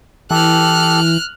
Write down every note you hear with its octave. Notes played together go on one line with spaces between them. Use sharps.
E3 G4 A4 F6 F#6